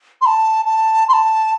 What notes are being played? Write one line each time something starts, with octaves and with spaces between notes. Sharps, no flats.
C6
A5
A5
C6
A5